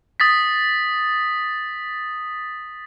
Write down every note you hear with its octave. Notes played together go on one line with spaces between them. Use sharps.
D#6 A6 B6